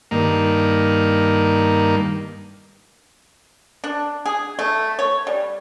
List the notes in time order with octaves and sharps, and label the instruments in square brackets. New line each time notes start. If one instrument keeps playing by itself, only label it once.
[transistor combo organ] G2 D#3 A#3
[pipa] D4
G#4
A3
C#5
G3